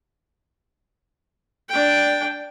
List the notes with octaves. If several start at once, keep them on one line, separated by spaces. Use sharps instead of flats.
D4 G5